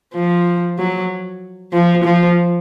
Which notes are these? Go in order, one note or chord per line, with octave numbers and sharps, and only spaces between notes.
F3
F#3
F3
F3